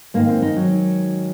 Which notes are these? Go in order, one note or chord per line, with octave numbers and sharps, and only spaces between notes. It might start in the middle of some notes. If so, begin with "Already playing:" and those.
G#2 D#3 A#3
C4
D#4
F#3